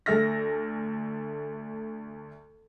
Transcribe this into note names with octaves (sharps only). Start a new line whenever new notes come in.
D2 A4 E5 F6 A#6